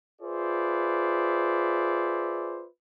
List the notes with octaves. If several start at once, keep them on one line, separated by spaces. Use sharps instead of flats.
F4 G#4 B4 C5 D5 E5